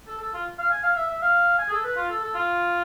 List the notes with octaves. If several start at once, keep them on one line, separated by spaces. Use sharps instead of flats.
A4
A4
F4
F5
G#5
F5
E5
E5
F5
G#5
G#4
A4
B4
F4
A4
A4
F4